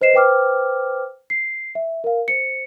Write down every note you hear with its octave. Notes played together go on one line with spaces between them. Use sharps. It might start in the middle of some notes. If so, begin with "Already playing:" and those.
B4 C5 D#5 C7 E7
B4 C5 G5 D6 F6
C7
E5
A#4 F5
C5 C#7